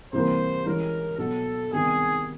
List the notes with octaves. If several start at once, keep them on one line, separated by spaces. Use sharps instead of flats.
C3 E3 G3 A#3 C5
E3 G#3 C#4 A#4
B2 F#3 B3 A4
C3 D#3 G3 B3 G#4